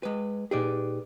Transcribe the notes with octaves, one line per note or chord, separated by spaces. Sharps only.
G#3 B4
A#2 D#4 G4 G#4 B4 D5